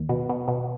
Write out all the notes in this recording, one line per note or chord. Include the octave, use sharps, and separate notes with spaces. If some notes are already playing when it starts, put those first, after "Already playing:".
Already playing: D#2
B2
B2
B2